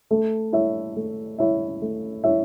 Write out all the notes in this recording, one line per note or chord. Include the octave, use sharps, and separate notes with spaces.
A3
E4 C#5 E5
A3
E4 C#5 E5
A3
E4 C#5 E5